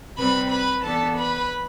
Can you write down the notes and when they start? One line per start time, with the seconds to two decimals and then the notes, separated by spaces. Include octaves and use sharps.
0.16 C3 G3 C4 B4 B5
0.50 B4 B5
0.83 E3 B3 D4 A4 A5
1.17 B4 B5